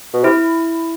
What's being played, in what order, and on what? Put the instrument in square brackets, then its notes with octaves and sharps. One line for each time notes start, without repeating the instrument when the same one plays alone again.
[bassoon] B2
[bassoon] C3 [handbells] E4